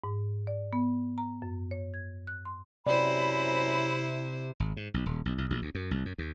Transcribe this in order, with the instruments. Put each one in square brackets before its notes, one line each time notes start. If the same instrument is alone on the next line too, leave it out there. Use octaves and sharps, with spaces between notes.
[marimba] G#2
D5
B3
A#5
F#2
C#5
G#6
F#6
C6
[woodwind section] F#2 A#5 B5 [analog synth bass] C3 [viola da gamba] E4 C5 [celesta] D5
[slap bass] G#1
G#2
B1
D#1
B1
C2
A#1
D2
F#2
C2
F#2
D#2